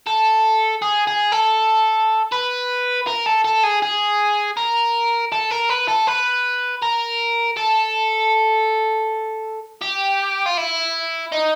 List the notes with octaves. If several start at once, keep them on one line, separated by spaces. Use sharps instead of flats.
A4
G#4
G#4
A4
B4
A#4
A4
A4
G#4
G#4
A#4
A4
A#4
B4
A4
B4
A#4
A4
G4
F4
E4
D#4